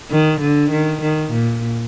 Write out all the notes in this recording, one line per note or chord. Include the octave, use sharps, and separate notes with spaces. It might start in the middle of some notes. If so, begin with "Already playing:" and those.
D#3
D3
D#3
D#3
A#2